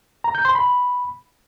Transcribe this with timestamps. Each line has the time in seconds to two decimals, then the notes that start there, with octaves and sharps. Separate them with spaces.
0.24 A#5
0.35 G6
0.45 C6
0.55 B5